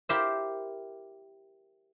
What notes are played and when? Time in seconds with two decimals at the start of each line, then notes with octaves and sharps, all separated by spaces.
0.09 E4 G4 A#4 C5 E5